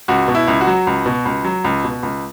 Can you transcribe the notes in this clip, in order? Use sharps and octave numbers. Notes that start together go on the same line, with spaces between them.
C#2 F#4
B2
E4
C#2
F#4
F#3
C#2
B2
C#2
F#3
C#2
B2
C#2